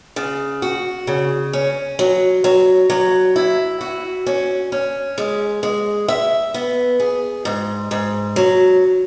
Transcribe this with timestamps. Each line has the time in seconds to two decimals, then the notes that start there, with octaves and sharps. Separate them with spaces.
0.16 C#3
0.62 F#4
1.07 C#3
1.53 C#4
1.99 F#3
2.44 F#3
2.90 F#3
3.36 E4
3.81 F#4
4.27 C#4
4.72 C#4
5.18 G#3
5.63 G#3
6.08 E5
6.54 B3
7.00 G#4
7.45 G#2
7.91 G#2
8.36 F#3